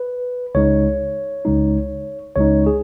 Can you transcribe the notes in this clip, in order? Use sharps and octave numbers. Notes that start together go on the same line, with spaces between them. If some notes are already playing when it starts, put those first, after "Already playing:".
Already playing: B4
C#2 C#3 G#3 D#4 C#5
C#2 C#3 G#3 D#4
C#2 C#3 G#3 D#4 C#5
G#4